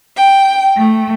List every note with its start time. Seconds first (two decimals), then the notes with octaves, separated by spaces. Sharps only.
0.17 G5
0.76 A3